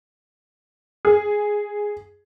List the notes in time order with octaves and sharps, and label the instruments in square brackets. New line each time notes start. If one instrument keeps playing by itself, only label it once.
[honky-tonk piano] G#4